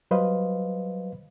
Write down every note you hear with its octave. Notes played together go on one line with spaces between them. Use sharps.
F#3 G3 B4 C5 D#5 F5